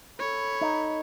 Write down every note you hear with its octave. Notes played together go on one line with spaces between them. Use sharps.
A4 C#5 B5
D#4